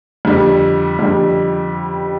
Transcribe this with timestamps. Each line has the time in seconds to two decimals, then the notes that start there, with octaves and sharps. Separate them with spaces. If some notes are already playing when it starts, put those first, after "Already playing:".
0.25 F2 D3 G3
0.99 F2 D3 G3